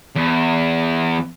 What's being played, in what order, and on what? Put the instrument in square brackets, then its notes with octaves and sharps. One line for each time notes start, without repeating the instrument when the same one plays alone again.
[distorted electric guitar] E2